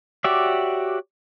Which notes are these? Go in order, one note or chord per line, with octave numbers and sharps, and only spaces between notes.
F#4 G4 C#5 D5 E5